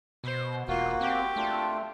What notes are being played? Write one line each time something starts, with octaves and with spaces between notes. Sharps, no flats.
B2 C5
E1 A#3 F4 F#4
C4 G4
A3 D4 F4